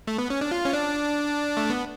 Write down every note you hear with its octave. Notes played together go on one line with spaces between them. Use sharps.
A3
B3
C#4
D4
F4
C#4
D4
A3
B3